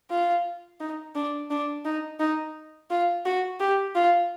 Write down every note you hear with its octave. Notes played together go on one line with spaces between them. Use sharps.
F4
D#4
D4
D4
D#4
D#4
F4
F#4
G4
F4